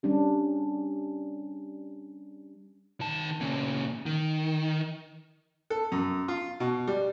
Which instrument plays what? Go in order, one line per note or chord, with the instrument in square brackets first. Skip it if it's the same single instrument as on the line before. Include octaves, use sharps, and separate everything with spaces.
[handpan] G3 C#4 D4 G4
[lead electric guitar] D#3 A5
A#2 C#3
D#3
[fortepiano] A4
F#2
F4
B2
G3